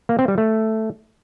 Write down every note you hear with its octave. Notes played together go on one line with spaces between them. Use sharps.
A#3
C4
G3
A3